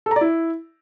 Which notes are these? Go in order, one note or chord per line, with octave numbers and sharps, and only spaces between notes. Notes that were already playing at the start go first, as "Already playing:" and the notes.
A4
A#5
D5
E4